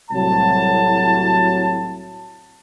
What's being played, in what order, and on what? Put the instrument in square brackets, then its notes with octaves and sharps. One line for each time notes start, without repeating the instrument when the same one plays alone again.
[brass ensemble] C2 A2 F#3 A5